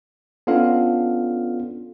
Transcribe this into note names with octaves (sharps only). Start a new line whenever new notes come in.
B3 C#4 D4 F4 A4 F5